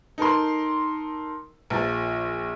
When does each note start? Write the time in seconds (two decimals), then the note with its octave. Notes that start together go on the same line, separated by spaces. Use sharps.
0.18 D#4 A4 A#4 C6
1.70 A#1 F3 A6